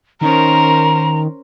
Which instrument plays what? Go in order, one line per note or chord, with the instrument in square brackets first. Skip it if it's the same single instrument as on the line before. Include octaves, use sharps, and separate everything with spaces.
[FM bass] D#3 [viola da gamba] C#4 A#4 C5 [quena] A#5